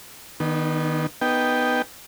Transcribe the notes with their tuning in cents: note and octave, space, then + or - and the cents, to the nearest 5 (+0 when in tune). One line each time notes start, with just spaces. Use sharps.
D#3 +0 B3 -20 D4 +40
B3 +0 D#4 -5 G5 +0